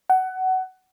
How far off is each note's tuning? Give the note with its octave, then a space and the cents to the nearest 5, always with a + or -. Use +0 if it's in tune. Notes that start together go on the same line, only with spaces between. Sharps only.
F#5 +20